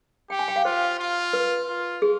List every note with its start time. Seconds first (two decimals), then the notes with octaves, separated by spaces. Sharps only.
0.30 G4 G5
0.39 G#5
0.48 G5
0.56 F5
0.65 F4 C5
1.00 F4
1.33 B4
1.68 F4
2.02 G#4